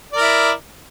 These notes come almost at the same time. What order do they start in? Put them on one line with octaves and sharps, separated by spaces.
D5 A#4 E4